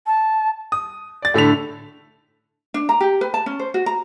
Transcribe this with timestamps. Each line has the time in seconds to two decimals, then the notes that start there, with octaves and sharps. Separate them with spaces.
0.07 A5
0.72 D#6
1.22 D5 A6
1.34 A2 D3 A4 B6 F7
2.74 D4
2.89 A#5
3.01 G4
3.21 B4
3.34 A5
3.46 C#4
3.59 C5
3.74 F#4
3.86 A#5